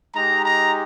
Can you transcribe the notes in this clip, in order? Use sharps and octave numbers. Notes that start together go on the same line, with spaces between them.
G#3 D#4 G4 A#5
A#5